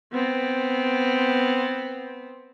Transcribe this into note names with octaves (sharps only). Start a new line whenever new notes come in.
B3 C4